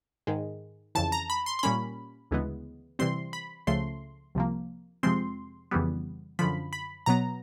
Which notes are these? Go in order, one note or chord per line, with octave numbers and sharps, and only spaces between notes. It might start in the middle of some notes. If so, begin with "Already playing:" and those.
G#2 D#3 G#3
F2 C#3 E3 A5
A#5
B5
C6
C6
A#2 G3 A#3 C#4 B5
D2 C#3 E3 G#3 B3
C3 E3 G3 C4 C6
B5
C#2 C#3 F3 A3 C6
C2 C3 F3 A#3
F2 C3 F3 G#3 C4 C6
F2 C#3 E3 G3 B3
F#2 D3 F3 B5
B5
B2 F#3 B3 A#5